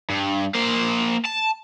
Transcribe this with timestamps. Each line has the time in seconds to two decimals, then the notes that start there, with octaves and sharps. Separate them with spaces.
0.10 G2
0.55 A#3 C5
1.25 A5